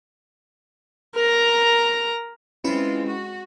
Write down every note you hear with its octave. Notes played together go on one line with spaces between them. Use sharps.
A#4 A#5
G#3 C4 C#4 E4 F4 B4
F#4